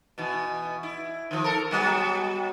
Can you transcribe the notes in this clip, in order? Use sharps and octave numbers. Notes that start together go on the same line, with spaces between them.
B2 E3
E4
D#3 F3
A4 A#4
F#3 G3 B3